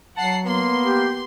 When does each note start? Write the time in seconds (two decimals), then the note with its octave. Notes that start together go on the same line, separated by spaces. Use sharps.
0.17 F#3 F#5 A5 C7
0.46 A#3 B3 C6
0.84 G4